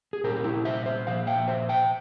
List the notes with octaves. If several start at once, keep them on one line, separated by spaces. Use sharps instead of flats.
G#4
A#2 G3 C#4 G4 A#4
E4 G4
C5 E5
C5 E5
A#2 F3 F5
E5 G5
C5 E5
E5 G5